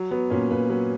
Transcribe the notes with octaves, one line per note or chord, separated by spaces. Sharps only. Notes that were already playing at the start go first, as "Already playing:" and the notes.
Already playing: F#3
F#3 B3
A#2 C#4
A#2 B4
F#3 B4